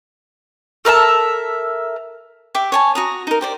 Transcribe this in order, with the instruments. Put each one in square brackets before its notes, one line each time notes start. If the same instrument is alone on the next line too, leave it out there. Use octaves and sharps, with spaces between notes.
[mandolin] A4 A#4 E5 A5
[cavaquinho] G4 E5 D6
C#5 G#5 A5
F#4 A#5 D#6
D#4 A#4
G4 C5 D5